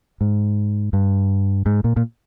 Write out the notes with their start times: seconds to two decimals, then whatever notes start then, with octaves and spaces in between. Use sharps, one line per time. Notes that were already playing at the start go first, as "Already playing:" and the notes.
0.21 G#2
0.93 G2
1.66 G#2
1.84 A#2
1.96 A#2